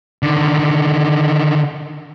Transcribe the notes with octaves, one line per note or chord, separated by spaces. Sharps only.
D3 D#3